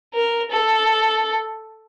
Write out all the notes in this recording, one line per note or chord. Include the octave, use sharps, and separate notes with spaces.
A#4
A4